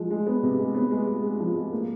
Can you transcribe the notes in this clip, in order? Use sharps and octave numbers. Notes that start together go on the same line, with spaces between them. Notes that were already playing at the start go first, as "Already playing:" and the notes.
Already playing: F3 G#3
G#3
B3
C3
G#3
B3
G#3
G#3
G#3
F3
G#3
A#3